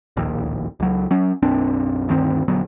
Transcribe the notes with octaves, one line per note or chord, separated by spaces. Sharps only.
D1 A#1 D#2
C#2 F#3
F#3 C#4
B1 F#2 C4 D4
D2 G2 D#3 C4
A#1 D3 F#3 B3